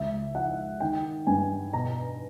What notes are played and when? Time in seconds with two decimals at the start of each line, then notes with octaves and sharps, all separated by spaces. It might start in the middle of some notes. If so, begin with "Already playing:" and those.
Already playing: C#2 E5
0.34 F3 F#5
0.80 D#3 G5
1.27 G2 G#5
1.73 B2 A#5